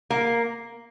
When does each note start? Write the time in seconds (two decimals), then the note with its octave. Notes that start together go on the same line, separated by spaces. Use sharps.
0.10 A#3